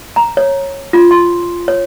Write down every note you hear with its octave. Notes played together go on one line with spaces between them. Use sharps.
A#5
C#5
F4
C6
C#5